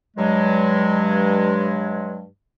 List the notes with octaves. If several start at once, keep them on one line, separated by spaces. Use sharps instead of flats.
G2 F#3 G#3